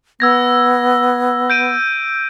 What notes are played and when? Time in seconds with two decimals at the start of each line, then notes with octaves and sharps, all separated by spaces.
0.20 B3 E6 G#6 A#6
1.50 G6 D7 D#7